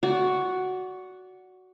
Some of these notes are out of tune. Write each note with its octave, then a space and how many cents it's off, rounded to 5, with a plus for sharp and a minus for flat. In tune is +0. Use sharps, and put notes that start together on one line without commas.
F#4 +0 D5 -25